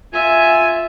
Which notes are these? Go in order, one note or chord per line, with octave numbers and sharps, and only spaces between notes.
F4 E5 G#5